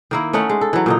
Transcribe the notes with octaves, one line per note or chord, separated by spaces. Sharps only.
D#3 A#3 E4
A3 C#4 D#4 F#5
G#3
A4
E3 F#3
A#2 D3 D#4